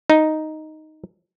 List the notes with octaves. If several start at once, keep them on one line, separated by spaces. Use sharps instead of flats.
D#4